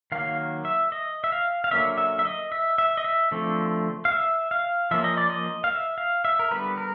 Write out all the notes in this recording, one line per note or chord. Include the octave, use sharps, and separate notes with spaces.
D#3 F#3 A#3 F5
E5
D#5
E5
F5
F5
D3 F#3 A#3 C#4 E5
E5
E5
D#5
E5
E5
D#5
E5
D3 F3 A3 C4
F5
E5
F5
F3 A#3 C#4 E5
D#5
D5
D#5
F5
E5
F5
E5
A#4
D3 G3 B3 B4
A#4